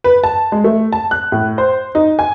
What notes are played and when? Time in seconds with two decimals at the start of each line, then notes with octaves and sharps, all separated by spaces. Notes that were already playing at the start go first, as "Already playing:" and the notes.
0.04 B4
0.24 A5
0.52 G#3
0.64 A3
0.92 A5
1.11 F#6
1.32 A2
1.58 C5
1.95 D#4
2.19 G#5